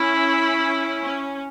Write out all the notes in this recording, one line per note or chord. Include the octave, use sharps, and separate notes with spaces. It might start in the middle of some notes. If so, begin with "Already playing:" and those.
Already playing: C#4 E4
C#4